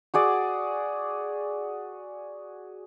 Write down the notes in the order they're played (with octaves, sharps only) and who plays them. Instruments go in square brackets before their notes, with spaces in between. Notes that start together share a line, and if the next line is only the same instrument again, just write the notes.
[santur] F#4 G#4 D5